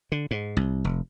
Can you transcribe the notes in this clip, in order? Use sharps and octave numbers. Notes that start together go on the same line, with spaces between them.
D3
G#2
C2
F1